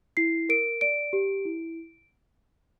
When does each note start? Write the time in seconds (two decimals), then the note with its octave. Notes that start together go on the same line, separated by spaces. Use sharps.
0.17 E4 C7
0.49 A#4 D7
0.81 D5 D7
1.13 G4
1.45 E4